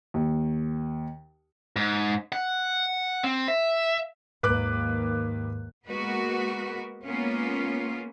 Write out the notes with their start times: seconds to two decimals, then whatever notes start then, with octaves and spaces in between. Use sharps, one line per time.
0.14 D#2
1.76 G#2
2.32 F#5
3.24 C4
3.48 E5
4.43 D#2 G#2 A#3 B4 D6 F#6
5.88 G#3 A#3 B3 F#4 A#4 B4
7.04 G#3 A#3 B3 C#4 F4